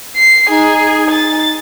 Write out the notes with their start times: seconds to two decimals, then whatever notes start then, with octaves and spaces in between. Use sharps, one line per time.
0.16 C7
0.49 D#4 G#4
1.11 A6